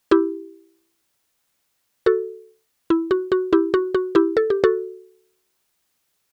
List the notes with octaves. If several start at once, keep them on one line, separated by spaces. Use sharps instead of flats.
E4 G4
F#4 A4
E4
F#4
F#4
E4 G4
F#4
F#4
E4 G4
A4
G4
F#4 A4